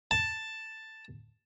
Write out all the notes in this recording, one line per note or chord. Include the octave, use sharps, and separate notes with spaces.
A5